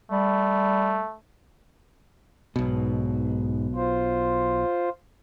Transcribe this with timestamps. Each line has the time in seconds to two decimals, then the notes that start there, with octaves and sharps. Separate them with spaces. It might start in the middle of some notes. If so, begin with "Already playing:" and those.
0.11 G3 A3
2.56 B1 G#2 B2
3.75 F4 C5